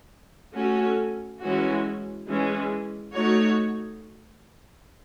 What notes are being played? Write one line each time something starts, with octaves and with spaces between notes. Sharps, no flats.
A3 C#4 F#4 A4
E3 G#3 C#4 F#4
E3 G#3 C#4
A3 D#4 F#4 C#5